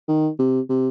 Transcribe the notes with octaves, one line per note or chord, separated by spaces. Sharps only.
D#3
C3
C3